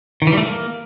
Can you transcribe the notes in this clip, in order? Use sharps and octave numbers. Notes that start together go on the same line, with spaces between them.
D#3
E3
G3
A3
A#3